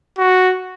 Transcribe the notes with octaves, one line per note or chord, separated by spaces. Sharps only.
F#4